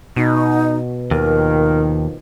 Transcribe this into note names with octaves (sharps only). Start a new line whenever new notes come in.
B2 D#4
D#2 D#3 F3 A#4